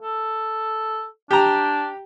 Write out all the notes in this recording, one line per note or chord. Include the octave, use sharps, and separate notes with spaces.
A4
D4 G4 A#5